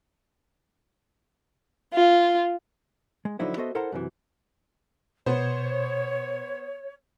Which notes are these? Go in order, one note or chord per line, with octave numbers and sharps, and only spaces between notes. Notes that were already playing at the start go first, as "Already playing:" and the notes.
F4
G#3
D3 F3 F#3 D#4 E4 C5
B3 F#4 A4 C5 D#5 E5
E4 A4 A#4 C5 F#5 A#5
F#2 C3 E3
B2 B3 C5 C#5